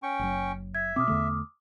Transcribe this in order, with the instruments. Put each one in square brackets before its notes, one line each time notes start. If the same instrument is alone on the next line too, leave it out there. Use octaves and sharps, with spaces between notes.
[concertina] C#4 G5 C#6
[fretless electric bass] F#1 F#3
[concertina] E5 [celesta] G#6
[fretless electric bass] B2 C4 [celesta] D6 D#6 F6
[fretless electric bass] E2 D3 A3